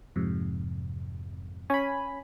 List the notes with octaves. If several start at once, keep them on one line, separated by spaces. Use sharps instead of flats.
F2 G#2 C3
C#4 G#5 B5